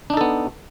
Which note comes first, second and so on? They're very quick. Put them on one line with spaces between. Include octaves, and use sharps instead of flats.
D4 D#4 A4 B3